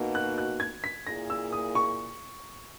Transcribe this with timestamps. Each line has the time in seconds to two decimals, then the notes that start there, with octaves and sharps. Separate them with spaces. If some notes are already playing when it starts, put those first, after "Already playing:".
Already playing: B2 A#3 D#4 F#4
0.15 F#6
0.38 F#6
0.60 G#6
0.84 B6
1.07 A#2 A#3 E4 G#4 A#6
1.30 E6
1.52 D#6
1.75 C#6